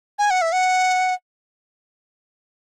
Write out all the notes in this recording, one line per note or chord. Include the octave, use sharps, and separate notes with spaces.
G#5
F#5
E5
F#5